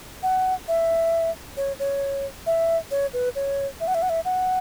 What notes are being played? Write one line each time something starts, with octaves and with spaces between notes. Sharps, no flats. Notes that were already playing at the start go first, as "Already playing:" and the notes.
F#5
E5
C#5
C#5
E5
C#5
B4
C#5
E5
F#5
E5
F#5
E5
F#5